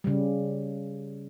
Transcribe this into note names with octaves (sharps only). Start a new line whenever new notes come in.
C#3 G3